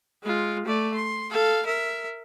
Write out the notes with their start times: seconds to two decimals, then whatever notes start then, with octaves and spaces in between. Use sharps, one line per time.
0.23 G#3 F4
0.65 A3 D5
0.94 C6
1.31 A4 F5
1.66 A#4 E5